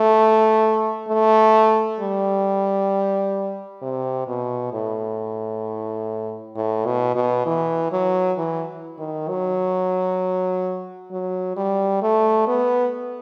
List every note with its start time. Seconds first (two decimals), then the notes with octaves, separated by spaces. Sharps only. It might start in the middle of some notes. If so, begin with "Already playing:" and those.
Already playing: A3
1.08 A3
2.00 G3
3.82 C3
4.27 B2
4.73 A2
6.56 A2
6.86 B2
7.15 B2
7.46 E3
7.92 F#3
8.38 E3
8.98 D#3
9.28 F#3
11.11 F#3
11.56 G3
12.02 A3
12.47 B3